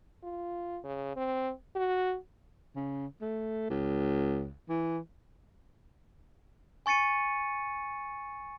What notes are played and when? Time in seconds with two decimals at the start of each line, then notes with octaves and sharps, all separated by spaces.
0.24 F4
0.84 C#3
1.16 C4
1.75 F#4
2.76 C#3
3.21 A3
3.70 C#2
4.70 E3
6.86 G#5 C#6 A6 C#7 D#7